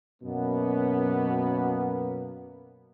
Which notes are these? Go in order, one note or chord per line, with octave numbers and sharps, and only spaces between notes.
F#2 B2 A#3 B3